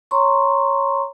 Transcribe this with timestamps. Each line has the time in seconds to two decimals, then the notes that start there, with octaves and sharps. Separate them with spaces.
0.11 C#5 A#5 C6 C#6